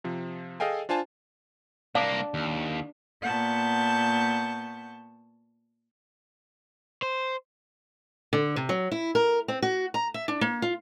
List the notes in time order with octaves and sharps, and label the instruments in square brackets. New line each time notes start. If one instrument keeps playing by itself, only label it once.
[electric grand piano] C3 F3
G#4 A4 D#5 F5 G5 G#5
D4 F4 C5 G#5 A5
[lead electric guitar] C2 A#3 [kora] D4 [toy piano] F5
[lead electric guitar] D#2
[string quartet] A#2 B3 F#5 A5 C#6 G6
[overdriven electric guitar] C5
[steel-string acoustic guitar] D3
C3
F#3
E4
A#4
C4
F#4
A#5
E5
D4
A#3
F4